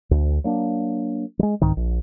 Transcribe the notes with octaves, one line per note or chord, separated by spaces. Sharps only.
D2
F#3 A#3 D4
F#3 G#3
C2 G#2 D#3
A#1